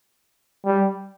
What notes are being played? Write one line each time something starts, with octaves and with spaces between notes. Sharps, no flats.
G3